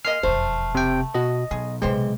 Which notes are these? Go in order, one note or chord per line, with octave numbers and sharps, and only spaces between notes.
G#3 A#3 D#5 F6 C7
E1 F2 A3 C5
C3 G5
B2 F#4 D#5
B1 B3 G#4
A#1 C3 E3 G#3 C5 G5